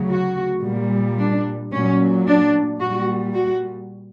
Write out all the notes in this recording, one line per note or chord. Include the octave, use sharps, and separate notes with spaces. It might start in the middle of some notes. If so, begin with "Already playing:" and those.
Already playing: D2 C#3 F#3
F#4
A#2 G3
D4
A#2 F#3 C#4
D4
A#2 G3 F#4
F#4